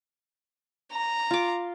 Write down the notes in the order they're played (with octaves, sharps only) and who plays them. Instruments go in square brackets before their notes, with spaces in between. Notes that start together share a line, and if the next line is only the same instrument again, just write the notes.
[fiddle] A#5
[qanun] F4 D6